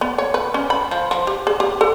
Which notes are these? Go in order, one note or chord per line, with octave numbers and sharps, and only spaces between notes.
B3
C#5
B4
C#4
B5
F3
F3
G4
G#4
G4
A4